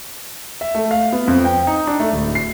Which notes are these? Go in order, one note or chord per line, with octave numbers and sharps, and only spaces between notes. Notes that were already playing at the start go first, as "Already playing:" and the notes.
E5
A3
F5
B3
F2
G5
D#4
D4
A3
D1
C7